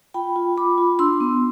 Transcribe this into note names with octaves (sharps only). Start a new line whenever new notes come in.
F4 G5 B5
F4
F4 B5 D6
F4
D4 C6 E6
B3